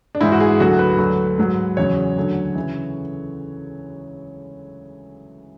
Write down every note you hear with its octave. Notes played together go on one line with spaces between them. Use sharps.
D4
G#2 E3 E4
F#4
G#4
D2 D3 F#3 F#4
B4
D2 D3 F#3
G#2 F#3
E2 C#3 F#3 C#5
D2 D3 F#3
C#3 E3